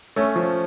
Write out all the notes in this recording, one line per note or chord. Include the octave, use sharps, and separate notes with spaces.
A3 C#4
F3